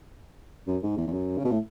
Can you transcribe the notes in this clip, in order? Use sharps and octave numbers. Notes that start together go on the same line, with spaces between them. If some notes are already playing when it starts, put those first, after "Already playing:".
F#2
G#2
E2
E2
F#2
C#3
B2
A2